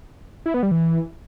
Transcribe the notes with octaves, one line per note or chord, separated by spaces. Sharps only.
E4
B3
G3
E3